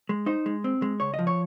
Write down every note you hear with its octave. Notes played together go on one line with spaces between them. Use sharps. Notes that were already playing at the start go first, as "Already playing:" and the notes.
G#3
D#4 C5
G#3
C4
G#3
C#2 C#5
D#5
F3
C#5